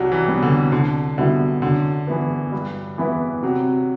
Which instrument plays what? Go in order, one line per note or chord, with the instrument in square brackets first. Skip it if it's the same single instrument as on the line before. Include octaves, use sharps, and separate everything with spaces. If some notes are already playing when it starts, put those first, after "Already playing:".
Already playing: [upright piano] C2 [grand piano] F#3 G3
[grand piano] E3
[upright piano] B2 G3 B3 D4
[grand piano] D3
[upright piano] C2 [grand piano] D3
[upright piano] B2 G3 B3 E4 [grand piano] D3
[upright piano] F#2 [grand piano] D3
[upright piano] E3 B3 E4 B4
G2
E3 B3 E4 B4
[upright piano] C3 [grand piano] F#3